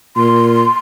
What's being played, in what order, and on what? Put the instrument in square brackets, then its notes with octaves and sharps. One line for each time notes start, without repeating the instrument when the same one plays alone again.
[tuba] A#2 [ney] C6